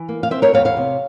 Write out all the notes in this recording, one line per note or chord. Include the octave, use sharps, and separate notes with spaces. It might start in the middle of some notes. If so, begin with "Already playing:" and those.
Already playing: E3
A#3
F5
C4 C5 E5
A#4 C#5
E2 C#5 F5
C#5 F5
C3